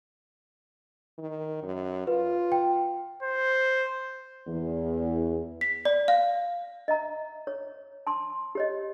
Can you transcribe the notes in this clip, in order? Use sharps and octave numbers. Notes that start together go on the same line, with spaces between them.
D#3
F#2
F4 B4
G5
C5
E2
B6
D5
F5
D#5 E5 A#5
C#5
A5 C6
G4 C#5 D#5